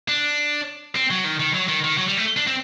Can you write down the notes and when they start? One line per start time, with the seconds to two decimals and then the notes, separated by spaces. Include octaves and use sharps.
0.08 D4
0.95 C4
1.11 F#3
1.24 D#3
1.40 D#3
1.54 F#3
1.68 D#3
1.84 D#3
1.98 F#3
2.08 G3
2.17 A3
2.37 D4
2.47 C4